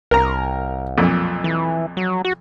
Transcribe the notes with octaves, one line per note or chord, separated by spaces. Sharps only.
C2 A#4 A#5
B1 F2 A#2
E3
F#3
F#4